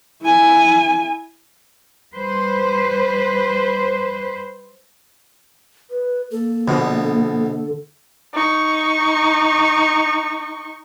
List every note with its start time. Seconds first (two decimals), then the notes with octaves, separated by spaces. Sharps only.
0.22 E4 G#5
2.14 G3 B4 C5
5.90 B4
6.31 A#3 A4
6.68 A#1 B2 D3
8.34 D#4 C#6